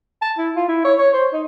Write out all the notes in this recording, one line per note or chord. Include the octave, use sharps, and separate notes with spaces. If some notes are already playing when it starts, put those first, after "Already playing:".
A5
E4
F4
E4
C#5
C#5
C5
D#4